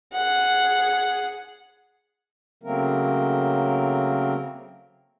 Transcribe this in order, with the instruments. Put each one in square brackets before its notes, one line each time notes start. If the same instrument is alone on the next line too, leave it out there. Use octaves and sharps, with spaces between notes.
[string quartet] G#4 F#5
[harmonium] C#3 F#3 A3 A#3 C4 A#4